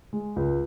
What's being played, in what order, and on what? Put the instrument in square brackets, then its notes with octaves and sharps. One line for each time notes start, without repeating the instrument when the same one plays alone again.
[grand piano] G#3
C#2